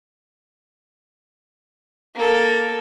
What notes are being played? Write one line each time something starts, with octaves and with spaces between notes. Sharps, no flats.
A#3 A4